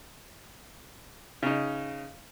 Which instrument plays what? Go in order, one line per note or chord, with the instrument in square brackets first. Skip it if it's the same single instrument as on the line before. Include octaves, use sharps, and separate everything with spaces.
[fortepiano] C#3 D#4